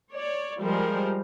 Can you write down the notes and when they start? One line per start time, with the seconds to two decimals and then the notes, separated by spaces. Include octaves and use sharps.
0.13 C#5 D5
0.61 F3 G3 G#3 A#4 C5